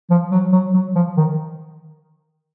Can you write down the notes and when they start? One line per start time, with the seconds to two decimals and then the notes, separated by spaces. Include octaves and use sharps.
0.10 F3
0.31 F#3
0.52 F#3
0.74 F#3
0.95 F3
1.17 D#3